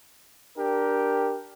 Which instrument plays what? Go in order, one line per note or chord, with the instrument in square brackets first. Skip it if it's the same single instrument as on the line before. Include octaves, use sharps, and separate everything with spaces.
[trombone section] D4 G4 A#4